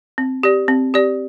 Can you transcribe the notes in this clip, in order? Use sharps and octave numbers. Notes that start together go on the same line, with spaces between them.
C4
G4 D5
C4
G4 D5